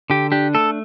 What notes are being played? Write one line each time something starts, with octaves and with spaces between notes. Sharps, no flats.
D3 G4
D4 G4
A3 A4